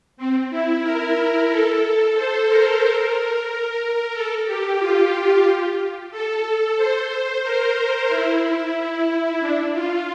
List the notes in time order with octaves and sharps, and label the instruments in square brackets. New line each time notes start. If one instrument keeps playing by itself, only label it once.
[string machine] C4
E4
A#4
A4
C5
A#4
A4
G4
F4
A4
C5
A#4
E4
D4
F4